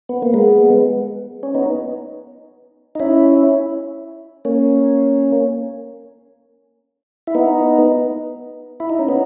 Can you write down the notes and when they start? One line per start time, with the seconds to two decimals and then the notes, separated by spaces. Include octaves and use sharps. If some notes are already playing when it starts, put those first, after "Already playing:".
0.09 B3
0.22 A#3
0.34 G#3 B3
1.43 C#4
1.55 B3 D#4
2.95 D#4
3.00 C#4 E4
4.45 A#3 C#4
7.27 E4
7.35 B3 D#4
8.80 E4
8.90 D#4
8.99 C#4
9.08 B3 D#4